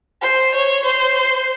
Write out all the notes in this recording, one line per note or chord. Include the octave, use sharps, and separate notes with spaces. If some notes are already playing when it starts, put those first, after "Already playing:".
C5
C#5
C5